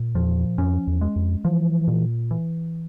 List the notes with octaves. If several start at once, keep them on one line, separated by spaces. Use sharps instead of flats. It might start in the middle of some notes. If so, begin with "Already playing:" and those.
Already playing: A#2
E2 F3
F2 C#4
E2
G#3
F2
E3 F3
A#2
E3